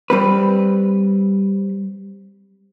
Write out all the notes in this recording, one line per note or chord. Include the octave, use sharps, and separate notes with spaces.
G3 C4 B4